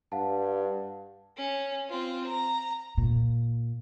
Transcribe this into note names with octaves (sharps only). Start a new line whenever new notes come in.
G2 F5 F#5 A5
C#4
C4 F4
A#5
A#2